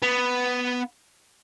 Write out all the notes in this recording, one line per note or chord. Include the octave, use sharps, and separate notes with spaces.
B3